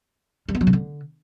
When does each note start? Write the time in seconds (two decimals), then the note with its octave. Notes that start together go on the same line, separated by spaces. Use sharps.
0.49 G3
0.55 B3
0.61 F#3
0.67 C#3
0.73 D3